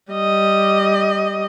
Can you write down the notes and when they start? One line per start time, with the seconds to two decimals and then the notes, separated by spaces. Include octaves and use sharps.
0.12 G3 D#5